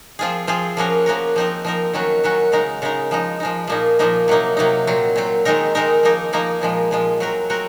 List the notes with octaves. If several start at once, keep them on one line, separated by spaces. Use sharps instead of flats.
F3 C4 F4 G#4
F3 C4 F4 G#4
F3 A#3 C#4 F#4 A#4
F3 A#3 C#4 F#4 A#4
F3 C4 D#4 A#4
F3 C4 D#4 A#4
D#3 F#3 C#4 F#4
D#3 F#3 C#4 F#4
C#3 G#3 D#4 A#4
C#3 G#3 D#4 A#4
F3 G#3 D#4
F3 G#3 D#4
A#2 F3 A#3 D#4
A#2 F3 A#3 D#4
C3 F#3 A#3 D#4
C3 F#3 A#3 D#4
A#2 F#3 C4
A#2 F#3 C4
D#3 G#3 C4 D#4 A#4
D#3 G#3 C4 D#4 A#4
F3 A#3 D#4 A#4
F3 A#3 D#4 A#4
A#2 F3 G#3
A#2 F3 G#3
F#3 C4 F#4 A#4
F#3 C4 F#4 A#4